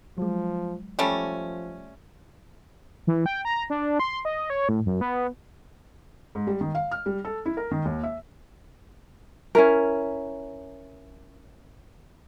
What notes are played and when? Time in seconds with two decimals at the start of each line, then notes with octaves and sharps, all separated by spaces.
0.18 F3 F#3 G#3
0.99 F3 G3 A3 C#4
3.07 E3
3.26 G5
3.45 A#5
3.70 D4
4.00 C6
4.25 D#5
4.50 C#5
4.69 A2
4.86 F#2
5.01 B3
6.35 G#2
6.47 G3
6.61 D#3
6.75 F5
6.91 F6
7.06 G3
7.25 A4
7.46 E4
7.57 A#4
7.71 D#3
7.85 D#2
8.03 E5
9.55 C#4 E4 A#4